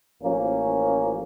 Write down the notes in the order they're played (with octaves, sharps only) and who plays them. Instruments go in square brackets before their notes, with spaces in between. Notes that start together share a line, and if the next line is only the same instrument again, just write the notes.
[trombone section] A1 F3 A#3 C#4